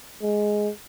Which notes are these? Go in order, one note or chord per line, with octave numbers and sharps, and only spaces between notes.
G#3